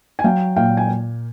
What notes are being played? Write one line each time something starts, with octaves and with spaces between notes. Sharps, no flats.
G#5
F#3 F5 G5
A#2 F5 G5
G#5